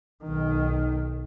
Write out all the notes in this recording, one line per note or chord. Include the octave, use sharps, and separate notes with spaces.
B1 D#3